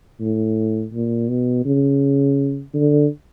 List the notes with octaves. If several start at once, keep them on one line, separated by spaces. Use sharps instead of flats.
A2
A#2
B2
C#3
D3